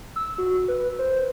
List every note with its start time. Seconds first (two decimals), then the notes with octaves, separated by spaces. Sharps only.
0.16 E6
0.38 F#4
0.68 B4
0.99 C5